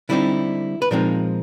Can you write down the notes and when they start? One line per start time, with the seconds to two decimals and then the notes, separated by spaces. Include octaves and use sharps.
0.09 D3 G3 C4 D#4 E4
0.82 B4
0.91 A#2 F3 G#3 C4 D#4 A#4